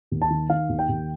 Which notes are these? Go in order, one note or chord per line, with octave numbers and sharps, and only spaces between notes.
D#2
A5
D#3
D#3 F5
D#2
G5
D#2